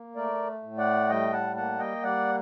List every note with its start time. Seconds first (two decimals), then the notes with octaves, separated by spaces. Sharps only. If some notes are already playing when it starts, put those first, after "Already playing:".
Already playing: A#3
0.16 A3 A#4 D5
0.63 A2
0.78 D5 F#5
1.09 G3 D#5 G5
1.32 F#5 A5
1.56 A#3 F#5 A5
1.79 D#5 G5
2.03 G3 D5 F#5